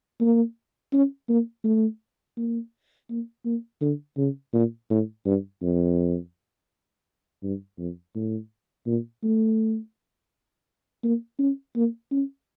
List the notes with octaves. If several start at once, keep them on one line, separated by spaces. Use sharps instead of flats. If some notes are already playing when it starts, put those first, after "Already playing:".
A#3
C#4
A#3
A3
A#3
A#3
A#3
D3
C#3
A#2
A2
G2
F2
G2
F2
A2
A#2
A3
A#3
C#4
A#3
C#4